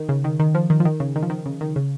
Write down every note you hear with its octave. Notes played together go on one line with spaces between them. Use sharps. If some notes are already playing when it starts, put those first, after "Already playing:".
Already playing: D#3
C#3
D#3
D#3
F3
D#3
F3
D#3
C#3
D#3
F3
D#3
C#3
D#3
C#3